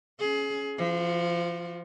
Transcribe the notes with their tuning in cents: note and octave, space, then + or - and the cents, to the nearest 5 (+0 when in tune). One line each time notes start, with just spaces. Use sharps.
C#4 +0 G#4 +25
F3 -25 F4 +40